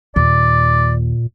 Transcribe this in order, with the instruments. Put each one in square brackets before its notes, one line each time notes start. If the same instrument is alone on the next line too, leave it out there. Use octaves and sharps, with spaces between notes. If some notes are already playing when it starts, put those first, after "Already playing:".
[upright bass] D#2 [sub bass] A#2 [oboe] D5